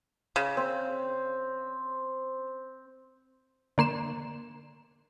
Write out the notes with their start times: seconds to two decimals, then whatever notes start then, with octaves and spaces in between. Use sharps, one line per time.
0.36 C#3
0.57 C4
3.78 D3 A#3 C6 E7